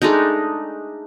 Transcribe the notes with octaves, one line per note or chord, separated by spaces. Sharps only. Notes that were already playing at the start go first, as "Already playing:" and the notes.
G#3 A3 D4 D#4